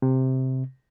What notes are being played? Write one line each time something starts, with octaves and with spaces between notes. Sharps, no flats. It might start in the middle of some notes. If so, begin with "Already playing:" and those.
C3